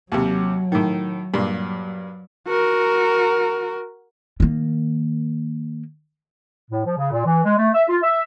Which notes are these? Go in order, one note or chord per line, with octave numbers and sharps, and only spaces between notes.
D#2 C3 F#3
A2 D#3
G2 A#2 F#3
F#4 A#4
D#3 A#3
A2
F3
C#3
A#2
E3
G#3
A3
E5
F4
E5